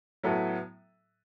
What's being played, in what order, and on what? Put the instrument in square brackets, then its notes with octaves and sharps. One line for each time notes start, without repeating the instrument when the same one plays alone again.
[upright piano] A2 F#3 B3 E4 A4